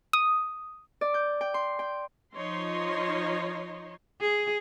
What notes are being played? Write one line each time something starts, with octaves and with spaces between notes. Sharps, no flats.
D#6
D5
G6
G5
C6
G5
F3 D#4 C#5 C6
G#4